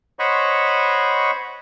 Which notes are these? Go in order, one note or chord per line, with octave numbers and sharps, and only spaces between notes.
C5 C#5 D#5 F#5 B5 C#6